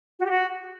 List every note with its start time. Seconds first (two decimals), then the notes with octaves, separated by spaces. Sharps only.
0.19 F#4
0.24 G4
0.30 F#4